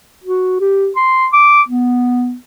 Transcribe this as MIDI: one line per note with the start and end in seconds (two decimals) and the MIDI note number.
0.24 0.56 66
0.61 0.90 67
0.96 1.27 84
1.33 1.62 86
1.69 2.35 59